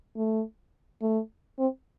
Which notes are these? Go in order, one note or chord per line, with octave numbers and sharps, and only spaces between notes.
A3
A3
C4